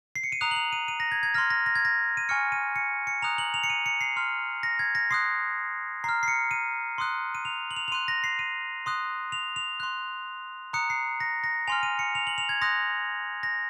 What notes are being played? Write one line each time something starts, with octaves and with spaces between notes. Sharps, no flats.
C7
C#7
D#7
A#5 D#6 F#6 F7
F#7
F7
D#7
D#7
A#6
G#6
G#6
C6 F6 A#6
A#6
A#6
G#6
A#6
D#7
G#5 C#6 F6 C#7
D#7
C#7
C#7
A#5 D#6 F#6 F7
F#7
F7
C#7
D#7
C#7
C7
C6 F6
A#6
G#6
A#6
C6 D#6 F#6 C7
A#5 F6 C7
C7
C#7
D#7
C6 D#6 F#6
D#7
F7
F#7
F7
F7
C6 F#6 D#7
A#6
C7
D#7
C6 D#6 F#6
F7
F7
C6 F#6
A#5 D#6 F#6 C#7
C7
A#6
A#6
G#5 C6 F6 F7
D#7
C#7
F7
F#7
F7
G#6
C6 D#6 F#6 A#6
A#6